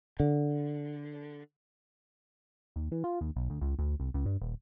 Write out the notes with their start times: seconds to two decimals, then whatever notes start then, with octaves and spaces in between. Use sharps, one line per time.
0.20 D3
2.76 D#2
2.91 E3
3.04 F4
3.21 D#2
3.36 B1
3.50 D2
3.61 C#2
3.79 D2
4.00 C2
4.14 C#2
4.26 G2
4.41 D#1